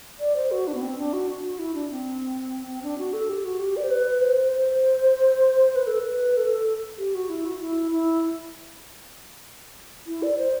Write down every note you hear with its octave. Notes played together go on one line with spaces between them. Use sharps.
D5
C5
F#4
D4
B3
C4
D4
F#4
F#4
E4
D4
C4
C4
D4
F#4
A4
G4
F#4
G4
D5
C5
B4
C5
C5
B4
A4
B4
A4
G4
F#4
E4
F#4
E4
E4
E4
D5
C5